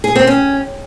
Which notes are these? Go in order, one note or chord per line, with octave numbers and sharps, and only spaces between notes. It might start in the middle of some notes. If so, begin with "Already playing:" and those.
G#4
C4
C#4